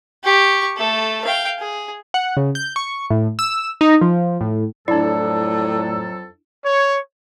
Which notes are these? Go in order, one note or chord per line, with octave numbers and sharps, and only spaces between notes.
G4 C#6
A3 A4
F5 G5
G#4
F#5
C#3
G6
C#6
A2
E6
D#4
F3
A2
F2 A2 F#3 D4 E4 A4 D5 A5
C#5